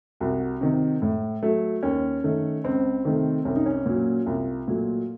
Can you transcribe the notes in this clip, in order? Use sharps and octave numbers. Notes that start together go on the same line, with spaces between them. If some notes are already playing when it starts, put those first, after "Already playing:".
C2 F#4
C3 D#3
A2
F#3 A3
D#2 C#4
D#3 A3
C#2 C4
C3 D#3 A3
C2 C#4
D#4
C#4
A#2 F#3
C2 F4
A#2 F#3 A3